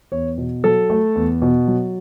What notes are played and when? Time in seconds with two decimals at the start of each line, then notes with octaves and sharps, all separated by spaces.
0.12 E2 C#5
0.38 B2
0.64 F#3 A4
0.90 A3
1.16 E2
1.42 B2
1.68 F#3